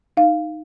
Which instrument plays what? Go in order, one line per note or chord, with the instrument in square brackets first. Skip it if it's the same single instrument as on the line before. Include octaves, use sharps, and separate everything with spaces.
[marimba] D#4 F5